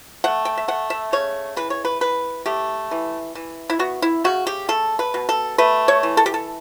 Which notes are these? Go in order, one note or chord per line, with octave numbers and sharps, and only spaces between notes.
A3 F#5
G5
E5
A3 F#5
E5
C#3 C#5
E3 B4
C#5
B4
E3 B4
A3 G4
E3
E3
E4
B3 F#4
E4
C#3 F#4
G4
A3 A4
B4
B2
A4
A3 B4
C#5
E3
A4
G4
A4